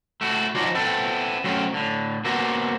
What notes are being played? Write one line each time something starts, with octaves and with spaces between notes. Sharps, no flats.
A3 E4 F#4
F3 F#3 D#4 F#4 C5 D5
B3 C4 E4 A4
F#3 A3 C4 C#4
A2 D3
A#3 B3 F#4 C5 E5